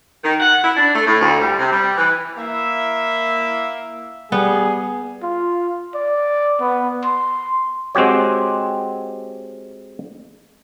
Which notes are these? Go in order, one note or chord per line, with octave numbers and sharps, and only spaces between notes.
D#3
F#5
E4
D4
A3
A2
D2
G3
C3
G3
E3
A#3 E4 E5
G3 B3 G#4
F4
D5
B3
C6
G#3 C4 F#4 G4 C#5